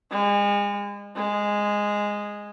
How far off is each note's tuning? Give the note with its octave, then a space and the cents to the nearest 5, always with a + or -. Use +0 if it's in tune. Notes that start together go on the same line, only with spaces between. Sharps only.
G#3 -35
G#3 -5